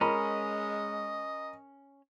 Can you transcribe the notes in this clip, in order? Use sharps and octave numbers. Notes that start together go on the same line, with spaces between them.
G#3 C#4 A#4 D#5 B5